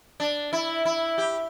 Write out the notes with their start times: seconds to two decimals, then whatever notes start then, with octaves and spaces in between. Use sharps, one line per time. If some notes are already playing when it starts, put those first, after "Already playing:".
0.20 D4
0.53 E4
0.85 E4
1.18 G4